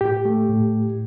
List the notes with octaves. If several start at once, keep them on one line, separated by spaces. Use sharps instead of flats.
A2 G4
A3
A2